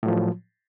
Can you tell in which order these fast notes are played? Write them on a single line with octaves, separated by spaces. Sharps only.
A2 F#3 F3